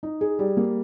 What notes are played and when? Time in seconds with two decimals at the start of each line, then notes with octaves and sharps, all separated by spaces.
0.03 D#4
0.21 G#4
0.39 G3
0.57 A#3